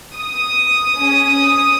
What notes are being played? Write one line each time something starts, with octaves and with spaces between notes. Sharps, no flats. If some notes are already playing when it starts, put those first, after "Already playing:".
D#6
C#4 G#4